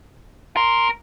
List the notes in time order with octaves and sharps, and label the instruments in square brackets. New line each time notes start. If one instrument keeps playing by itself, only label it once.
[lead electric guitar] A#4 [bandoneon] C6